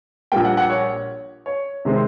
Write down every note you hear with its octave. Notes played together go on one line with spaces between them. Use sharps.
A#1 A#2 G3 A#3 G5
F#5
F#5
C#5
C#5
C3 D#3 G#3 C4